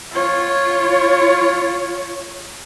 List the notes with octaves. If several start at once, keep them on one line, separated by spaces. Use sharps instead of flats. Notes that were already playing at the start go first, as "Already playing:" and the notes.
F4 C#5